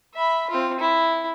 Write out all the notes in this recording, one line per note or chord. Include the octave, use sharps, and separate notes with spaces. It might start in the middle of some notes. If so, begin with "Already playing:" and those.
E5 B5
C4 F4
E4